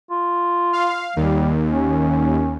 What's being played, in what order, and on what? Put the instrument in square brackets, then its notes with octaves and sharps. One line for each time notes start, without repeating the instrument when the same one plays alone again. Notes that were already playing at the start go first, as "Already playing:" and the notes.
[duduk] F4
[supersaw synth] F5
[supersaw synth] D#2 [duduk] G3
[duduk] C#4